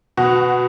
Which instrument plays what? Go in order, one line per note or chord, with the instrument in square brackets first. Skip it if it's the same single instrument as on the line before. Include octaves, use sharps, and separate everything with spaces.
[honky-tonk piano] B2 F#4